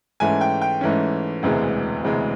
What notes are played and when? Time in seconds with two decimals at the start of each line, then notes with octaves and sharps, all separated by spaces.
0.20 G#2 E3 A3 C#4 G#5
0.41 G5
0.61 G5
0.81 G#2 E3 A3 C#4
1.43 E1 D2 C3 E3 G#3
2.03 E1 D2 C3 E3 G#3